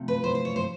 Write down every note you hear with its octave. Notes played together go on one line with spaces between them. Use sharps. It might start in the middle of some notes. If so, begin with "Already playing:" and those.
Already playing: C3 F3 A3
B4
C5
C5
C#5
C5